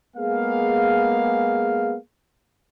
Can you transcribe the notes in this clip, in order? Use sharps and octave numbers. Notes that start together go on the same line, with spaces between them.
G#3 A#3 B3 G#4 F5